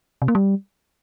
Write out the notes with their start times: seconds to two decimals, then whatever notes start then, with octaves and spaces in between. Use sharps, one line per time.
0.22 C3
0.28 A#3
0.35 G3